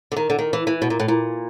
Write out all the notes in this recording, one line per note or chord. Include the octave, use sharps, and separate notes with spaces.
D3
D#3
D3
D#3
E3
E3
B2
A#2
A2
A#2